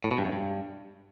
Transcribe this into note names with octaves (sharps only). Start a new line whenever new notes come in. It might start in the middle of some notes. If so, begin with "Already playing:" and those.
A2
B2
G2
F#2
G2